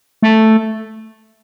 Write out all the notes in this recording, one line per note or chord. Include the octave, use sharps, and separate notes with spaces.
A3